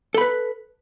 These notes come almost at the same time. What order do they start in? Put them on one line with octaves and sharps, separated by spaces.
A4 B5 B4